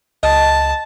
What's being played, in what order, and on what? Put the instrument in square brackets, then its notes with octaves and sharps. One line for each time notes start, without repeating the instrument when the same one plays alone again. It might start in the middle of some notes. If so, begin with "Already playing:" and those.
[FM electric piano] C#2 D#5 [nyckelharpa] A5